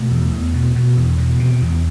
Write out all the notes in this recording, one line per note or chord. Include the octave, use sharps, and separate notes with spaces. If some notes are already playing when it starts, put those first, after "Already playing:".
Already playing: B2 A3
E2
E2
B2
B2
E2
B2
C3
E2